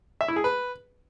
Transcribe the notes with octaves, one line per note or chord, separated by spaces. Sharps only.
E5
E4
G#4
B4